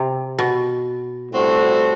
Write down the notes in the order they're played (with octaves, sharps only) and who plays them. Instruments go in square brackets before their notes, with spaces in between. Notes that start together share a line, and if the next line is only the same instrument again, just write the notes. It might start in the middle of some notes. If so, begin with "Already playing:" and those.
Already playing: [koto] C3
B2
[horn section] A2 G3 C4 F#4 A4